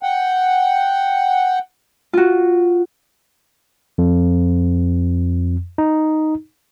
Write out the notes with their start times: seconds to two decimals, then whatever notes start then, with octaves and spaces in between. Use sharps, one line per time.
0.03 F#5 G5
2.13 F4 F#4
3.98 F2
5.78 D#4